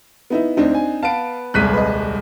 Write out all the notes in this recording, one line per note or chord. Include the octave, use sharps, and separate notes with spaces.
B3 D#4 E4
D2 C4 D4 D#4
G#5
B3 B4 F5 A5 D7
D#1 C2 G#3 F#6 B6 D#7
B4 D#5